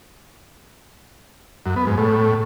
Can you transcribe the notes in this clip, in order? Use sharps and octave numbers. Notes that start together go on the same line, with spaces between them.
F#2
B3
G#2
A2